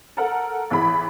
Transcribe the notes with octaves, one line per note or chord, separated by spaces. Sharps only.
A4 A#4 F#5
A1 E3 G#4 B5